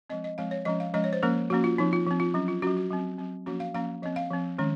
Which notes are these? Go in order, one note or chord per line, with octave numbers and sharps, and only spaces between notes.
F3 G#3 C4 D#5
D#5
F3 G#3 C4 F5
C#5
F3 G#3 C#4 D#5
F5
F3 G#3 C#4 D#5
C#5
C5
F3 A#3 C#4 A#4
F3 A#3 C#4 F#4
F4
F3 C4 D#4
F4
F3 C4
F4
F#3 C#4
F4
F#3 C#4 F#4
F#4
F#3 C4
F#3 C4
F3 A#3 C#4 F#4
F5
F3 A#3 C#4 F5
F3 C4 D#5
F5
F3 C4
D#3 G#3 C#4